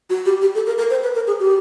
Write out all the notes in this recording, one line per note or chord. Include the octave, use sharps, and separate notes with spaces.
F#4
G4
G4
A4
A#4
A#4
C5
B4
A#4
G#4
G4